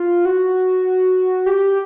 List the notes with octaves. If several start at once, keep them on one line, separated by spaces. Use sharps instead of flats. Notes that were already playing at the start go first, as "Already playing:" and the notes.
Already playing: F4
F#4
G4